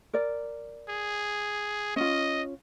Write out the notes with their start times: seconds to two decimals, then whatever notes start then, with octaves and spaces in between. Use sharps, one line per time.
0.13 A#4 D5
0.89 G#4
1.96 C#4 F4 D#5